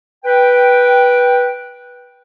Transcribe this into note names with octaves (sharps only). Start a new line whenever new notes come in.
B4 G5